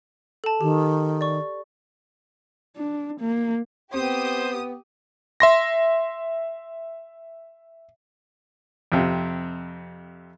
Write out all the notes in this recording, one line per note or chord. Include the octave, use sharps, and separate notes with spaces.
A4 A5
D#3 G4
D5 C#6
D4
A#3
B3 C4 G4 C5 D#6
E5 C6 A#6
F2 C3